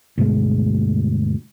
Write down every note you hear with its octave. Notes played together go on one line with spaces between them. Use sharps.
D2 G2 B2 G#3